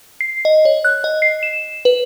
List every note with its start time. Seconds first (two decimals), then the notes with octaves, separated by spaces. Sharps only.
0.21 C7
0.45 D#5
0.65 C#5
0.85 F#6
1.04 D#5
1.22 C7
1.43 E7
1.85 B4